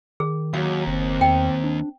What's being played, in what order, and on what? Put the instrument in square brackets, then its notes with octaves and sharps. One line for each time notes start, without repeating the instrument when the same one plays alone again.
[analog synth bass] D#3 [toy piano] G#4
[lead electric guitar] D#2 [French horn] F#3 [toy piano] F5
[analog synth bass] F#1 [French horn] C4
[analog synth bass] E2 [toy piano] G5
[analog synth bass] D4